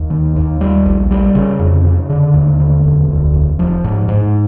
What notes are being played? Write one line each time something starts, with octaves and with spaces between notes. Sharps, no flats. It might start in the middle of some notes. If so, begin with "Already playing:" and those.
Already playing: D#2
D#3
D#2
G3
A#1
G3
C#3
F2
C#3
D3
D#2
D3
E1
D2
E1
F3
G#2
G#2